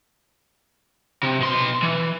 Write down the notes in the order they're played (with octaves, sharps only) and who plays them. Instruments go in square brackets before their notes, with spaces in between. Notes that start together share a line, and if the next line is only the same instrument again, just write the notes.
[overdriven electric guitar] C3
B2 C6
E3